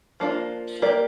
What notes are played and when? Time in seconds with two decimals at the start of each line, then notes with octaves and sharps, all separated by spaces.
0.20 F3 A#3 D4 F4
0.82 A#3 G4 A#4 D5